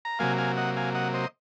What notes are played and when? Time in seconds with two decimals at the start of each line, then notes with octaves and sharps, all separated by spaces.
0.05 A#5
0.19 C3 F#3 A#3 F5 G#5
0.38 F5 G#5
0.57 D#5 F#5
0.76 F5 G#5
0.95 D#5 F#5
1.14 C5 D#5